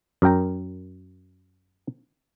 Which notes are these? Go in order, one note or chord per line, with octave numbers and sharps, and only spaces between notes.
F#2 A#4 G5 A#5